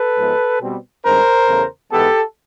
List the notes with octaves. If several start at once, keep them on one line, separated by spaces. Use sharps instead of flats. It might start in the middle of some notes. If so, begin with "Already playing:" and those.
Already playing: A4 B4
G#2 F3 G#3 B3
B2 G3 C4
G2 D#3 G#3 C4 A#4 C5
E2 C#3 E3 A3
G#2 E3 G#3 B3 G4 A4